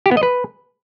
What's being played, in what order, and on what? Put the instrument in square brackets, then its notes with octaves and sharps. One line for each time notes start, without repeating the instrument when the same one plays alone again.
[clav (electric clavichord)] G4
B3
D#5
B4